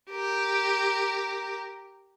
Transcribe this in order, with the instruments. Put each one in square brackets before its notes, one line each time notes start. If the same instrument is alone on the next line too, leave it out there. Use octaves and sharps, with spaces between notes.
[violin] G4 A#4